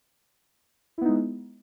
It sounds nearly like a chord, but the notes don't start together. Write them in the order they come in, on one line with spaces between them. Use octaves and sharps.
E4 B3 D#4 G#3